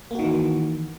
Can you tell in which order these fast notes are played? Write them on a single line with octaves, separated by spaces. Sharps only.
A#3 F#4 D#3 E3